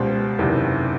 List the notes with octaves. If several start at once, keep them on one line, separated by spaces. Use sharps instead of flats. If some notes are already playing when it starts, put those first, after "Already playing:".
Already playing: C#2 B2 G3 C5
F#1 E2 C3 D#3